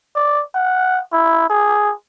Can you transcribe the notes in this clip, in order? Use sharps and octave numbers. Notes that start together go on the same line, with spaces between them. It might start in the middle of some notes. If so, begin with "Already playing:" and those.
D5
F#5
E4
G#4